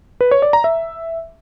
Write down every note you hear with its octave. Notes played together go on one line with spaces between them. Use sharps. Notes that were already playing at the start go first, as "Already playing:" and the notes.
B4
C#5
D5
A#5
E5